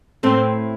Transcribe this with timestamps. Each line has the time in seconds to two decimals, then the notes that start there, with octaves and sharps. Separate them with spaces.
0.23 A2 A3 C4